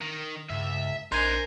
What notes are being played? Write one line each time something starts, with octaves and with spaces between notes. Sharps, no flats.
D#3
C#2 G2 E5
A#1 D4 D#4 A#4 C5 G#5 C6